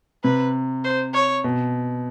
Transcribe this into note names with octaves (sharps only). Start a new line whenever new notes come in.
C3 B4
C5
C#5
B2